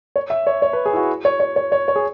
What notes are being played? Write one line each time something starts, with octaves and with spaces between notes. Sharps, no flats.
C#5
E5
C#5
C#5
B4
G#4
E4
F#4
C#5
C#5
C#5
C#5
C#5
G#4